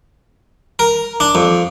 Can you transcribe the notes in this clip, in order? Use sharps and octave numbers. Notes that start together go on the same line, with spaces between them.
A#4
D4
F2